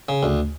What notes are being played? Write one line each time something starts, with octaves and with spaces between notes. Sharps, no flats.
C#3
D2